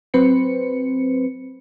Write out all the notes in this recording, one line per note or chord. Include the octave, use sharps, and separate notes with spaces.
F#3 C4 B4 C5 C#7